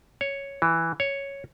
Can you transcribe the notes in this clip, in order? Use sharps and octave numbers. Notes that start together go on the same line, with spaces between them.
C#5
E3
C#5